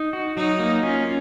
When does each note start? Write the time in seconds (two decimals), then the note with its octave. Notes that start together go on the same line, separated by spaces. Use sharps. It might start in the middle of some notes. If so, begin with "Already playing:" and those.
Already playing: D#4
0.13 F#4
0.37 F#3 D#4
0.60 A#3
0.82 C#4 F4